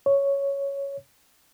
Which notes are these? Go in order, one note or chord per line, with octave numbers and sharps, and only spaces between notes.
C#5